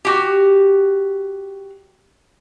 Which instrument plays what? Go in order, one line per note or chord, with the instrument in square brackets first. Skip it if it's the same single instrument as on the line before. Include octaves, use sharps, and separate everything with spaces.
[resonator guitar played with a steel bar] F#4 G4